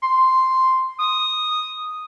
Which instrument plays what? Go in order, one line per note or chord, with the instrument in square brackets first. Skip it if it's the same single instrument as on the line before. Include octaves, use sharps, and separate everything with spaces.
[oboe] C6
D#6